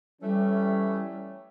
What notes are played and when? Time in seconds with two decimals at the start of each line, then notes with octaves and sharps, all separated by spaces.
0.22 E3 G3 A3 C#4